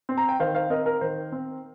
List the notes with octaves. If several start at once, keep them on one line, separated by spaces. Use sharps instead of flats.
C4
A#5
G5
D#3 C5 F5
C5 F5
C4 A#4 D#5
A#4
D#3 C5
C4